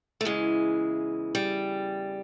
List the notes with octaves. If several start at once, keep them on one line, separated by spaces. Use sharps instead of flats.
A3
E2 C#3 E3 G#3
G3